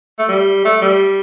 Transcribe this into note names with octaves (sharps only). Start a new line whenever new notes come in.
A3
G3
A3
G3